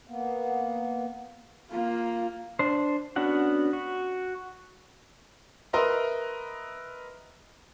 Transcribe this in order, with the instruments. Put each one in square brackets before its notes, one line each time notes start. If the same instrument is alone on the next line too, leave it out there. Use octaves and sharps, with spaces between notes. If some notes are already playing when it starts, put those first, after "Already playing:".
[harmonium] A#3 B3
[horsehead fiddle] A#3 F4
[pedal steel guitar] D4 C5
B3 C#4 D4 F#4 F#5
F#4
[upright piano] A#4 B4 D#5 E5 A#5 C6